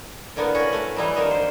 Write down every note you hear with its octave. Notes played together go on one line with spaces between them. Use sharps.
A2 D3 A#3 B3
C#4 F#4
A3
E3 G3 D#4 E4
D3 D#3 A#3 D#4
C5